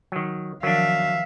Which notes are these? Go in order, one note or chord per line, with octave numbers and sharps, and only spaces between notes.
D#3 F#3
D#3 F3 F#3 D4 A#4 E5 F5